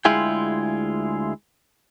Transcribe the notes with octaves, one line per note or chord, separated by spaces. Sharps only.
D2 G#3 E4 F4 G#4 G5